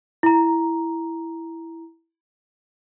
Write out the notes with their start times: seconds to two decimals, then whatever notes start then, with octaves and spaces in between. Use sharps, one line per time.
0.23 E4 A#5